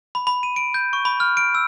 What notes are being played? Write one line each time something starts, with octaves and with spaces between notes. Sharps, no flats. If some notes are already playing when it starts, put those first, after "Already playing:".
B5
B5
D#7
D7
G6
C#6
B5
F6
D7
E6